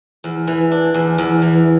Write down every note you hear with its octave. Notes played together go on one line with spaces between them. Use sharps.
E2
E3
D4
E2
E2
E3